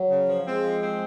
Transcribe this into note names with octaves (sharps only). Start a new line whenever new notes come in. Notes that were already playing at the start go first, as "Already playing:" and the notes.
Already playing: F#3
C#3
F3
G#3 C4
F3
C4